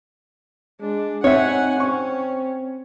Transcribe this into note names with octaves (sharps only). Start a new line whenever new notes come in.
G#3 D4
C4 D#4 C#5 E5 F#5 G#5
C4 C#4 C#6